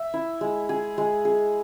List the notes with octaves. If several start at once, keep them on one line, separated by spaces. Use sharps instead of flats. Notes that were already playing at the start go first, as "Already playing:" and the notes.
Already playing: E5
E4
G#3
G#4
G#3
G#4